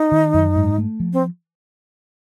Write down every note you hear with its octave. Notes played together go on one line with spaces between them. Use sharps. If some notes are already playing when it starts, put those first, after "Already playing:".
Already playing: D#4
D#3
F#2
G#2
A3
F3
C4